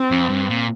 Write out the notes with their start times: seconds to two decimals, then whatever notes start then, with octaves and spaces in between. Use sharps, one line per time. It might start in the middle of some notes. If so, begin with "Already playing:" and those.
Already playing: C4
0.11 F2
0.29 G2
0.49 A#2